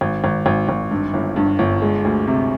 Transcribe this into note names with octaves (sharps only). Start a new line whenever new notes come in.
G#1
G#1
G#1
G#1
G2
G1
G2
G1
G#3
D2
C3